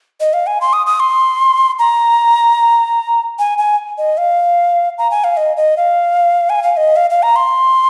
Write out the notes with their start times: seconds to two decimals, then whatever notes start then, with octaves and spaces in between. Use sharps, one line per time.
0.20 D#5
0.33 F5
0.47 G#5
0.61 C6
0.73 D#6
0.87 D#6
1.00 C6
1.79 A#5
3.39 G#5
3.58 G#5
3.98 D#5
4.18 F5
4.98 A#5
5.11 G#5
5.24 F5
5.37 D#5
5.57 D#5
5.77 F5
6.50 G#5
6.63 F5
6.77 D#5
6.96 F5
7.10 F5
7.23 A#5
7.36 C6